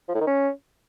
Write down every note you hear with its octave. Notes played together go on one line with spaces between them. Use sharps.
F3
A2
D#3
C#4